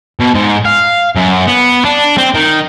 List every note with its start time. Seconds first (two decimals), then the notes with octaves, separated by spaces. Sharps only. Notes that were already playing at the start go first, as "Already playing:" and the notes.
0.20 B2
0.35 G#2
0.65 F5
1.16 F#2
1.47 B3
1.85 D4
2.18 C4
2.35 D#3